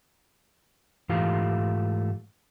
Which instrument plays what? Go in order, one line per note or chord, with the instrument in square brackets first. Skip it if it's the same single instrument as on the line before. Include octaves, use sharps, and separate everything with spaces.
[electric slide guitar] G#2 E3 A3 F4 G4 F5